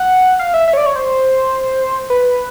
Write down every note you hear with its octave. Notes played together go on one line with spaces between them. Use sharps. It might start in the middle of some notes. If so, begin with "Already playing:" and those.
Already playing: F#5
F5
E5
E5
C#5
D5
C#5
C5
B4